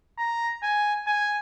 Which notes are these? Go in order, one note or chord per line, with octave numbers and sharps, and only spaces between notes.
A#5
G#5
G#5